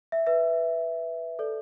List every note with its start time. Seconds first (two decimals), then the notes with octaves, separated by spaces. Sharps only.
0.12 E5
0.27 B4 E5
1.39 A4 D5